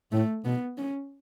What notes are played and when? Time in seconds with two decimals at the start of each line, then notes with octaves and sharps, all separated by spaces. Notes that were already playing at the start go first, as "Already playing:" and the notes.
0.12 A2 A3
0.44 B2 B3
0.78 C#4